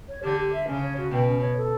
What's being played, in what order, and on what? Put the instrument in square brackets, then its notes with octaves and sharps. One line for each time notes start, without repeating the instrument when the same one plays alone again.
[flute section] C#5
[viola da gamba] D3 [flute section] G4
[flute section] G4
E5
[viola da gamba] C#3 [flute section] C#4
[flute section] C#5
F#4
[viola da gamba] B2 [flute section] G5
[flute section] C#4
C#5
A4